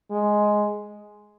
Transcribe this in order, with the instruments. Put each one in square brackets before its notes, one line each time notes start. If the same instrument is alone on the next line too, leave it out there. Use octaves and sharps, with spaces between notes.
[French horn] G#3